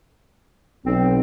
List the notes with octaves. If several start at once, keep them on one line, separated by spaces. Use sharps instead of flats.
B1 C4